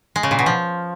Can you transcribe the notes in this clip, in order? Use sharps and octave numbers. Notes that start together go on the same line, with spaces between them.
G#3
C#3
A#2
B2
F3